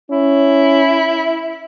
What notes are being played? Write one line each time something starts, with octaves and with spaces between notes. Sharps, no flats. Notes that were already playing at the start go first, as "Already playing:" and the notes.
C#4 E4